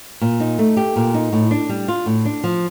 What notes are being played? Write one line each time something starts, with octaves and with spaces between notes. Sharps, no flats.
A#2
D#4
A3
G4
A#2
D#4
A2
D4
G3
F4
A2
D4
F3